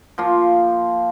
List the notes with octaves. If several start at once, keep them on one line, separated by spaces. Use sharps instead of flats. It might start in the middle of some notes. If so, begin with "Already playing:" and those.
F3 A#3 F4